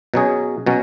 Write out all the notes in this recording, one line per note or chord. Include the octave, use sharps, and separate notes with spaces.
B2 F#3 C#4 G#4
B2 F#3 C#4